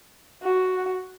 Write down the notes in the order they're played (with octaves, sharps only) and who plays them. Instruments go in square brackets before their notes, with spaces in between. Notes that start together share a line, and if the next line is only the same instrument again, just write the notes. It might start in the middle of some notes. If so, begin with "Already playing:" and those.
[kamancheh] F#4